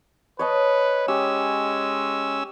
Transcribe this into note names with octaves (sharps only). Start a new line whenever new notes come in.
B4 C#5 D#5 A5
G#3 C#4 G4 E6